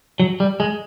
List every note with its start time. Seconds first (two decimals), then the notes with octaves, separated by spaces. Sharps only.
0.20 F#3
0.40 G3
0.60 G#3